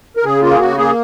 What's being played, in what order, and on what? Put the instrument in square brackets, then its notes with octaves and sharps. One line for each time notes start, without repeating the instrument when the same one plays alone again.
[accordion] A#4
C#3 G#4
A#3 F4
G#4
C#3 F#4
A#3 G#4